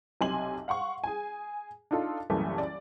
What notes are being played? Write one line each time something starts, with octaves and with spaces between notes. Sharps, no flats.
B1 C3 G#5 C6 F#7
F5 F#5 C6 C#6
G#4 G#5
D4 D#4 F4 A4
C2 F#2 A#2 C#3 E3 A3
D5